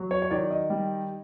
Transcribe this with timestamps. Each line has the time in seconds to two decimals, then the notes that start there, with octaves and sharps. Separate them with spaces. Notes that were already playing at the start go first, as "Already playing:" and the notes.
Already playing: F#3
0.11 C#5
0.22 C#5
0.30 D#3 D5
0.51 D#5
0.70 G3